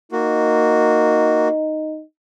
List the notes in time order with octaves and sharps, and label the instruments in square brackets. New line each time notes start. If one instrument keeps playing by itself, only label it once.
[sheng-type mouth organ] A#3 F#4 [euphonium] D#4